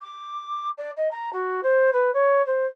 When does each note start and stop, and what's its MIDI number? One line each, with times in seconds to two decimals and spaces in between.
0.01 0.69 86
0.78 0.91 74
0.97 1.08 75
1.11 1.30 82
1.33 1.61 66
1.63 1.90 72
1.93 2.11 71
2.14 2.44 73
2.46 2.66 72